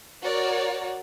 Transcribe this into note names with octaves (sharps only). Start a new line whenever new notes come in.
F#4 A#4 C#5 D5